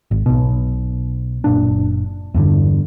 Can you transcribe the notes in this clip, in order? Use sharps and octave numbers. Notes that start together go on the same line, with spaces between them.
G#1
B1 B2
F#1 A#2 D4
E2 G2 D3